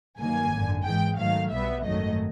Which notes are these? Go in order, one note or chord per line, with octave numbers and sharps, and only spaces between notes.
G2 D#3 F#3 A#3 G#5
G#1 F#2 D3
G#2 E3 G#3 G5
G#2 D#3 F#3 A3 F5
B1 B2 G3 B3 E5
G#1 F#2 D#3 F#3 A3 D#5